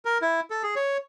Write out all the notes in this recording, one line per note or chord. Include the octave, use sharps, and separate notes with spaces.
A#4
E4
A4
G#4
C#5